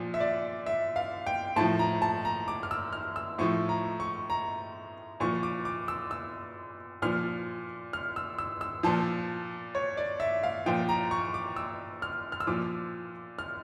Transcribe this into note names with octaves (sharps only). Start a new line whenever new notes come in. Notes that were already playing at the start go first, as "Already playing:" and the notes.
Already playing: A#2 F3
E5
D5
E5
F5
G5
A2 F3 A5
A#5
A5
A#5
D6
F6
E6
F6
E6
A2 F3 C#6
A#5
C#6
A#5
A#2 F3 C#6
D6
D6
E6
E6
A#2 F3 F6
F6
E6
E6
E6
A#2 F3 A5
C#5
D5
E5
F5
A#2 F3 G5
A#5
C#6
D6
E6
F6
F6
E6
A#2 F3 D6
F6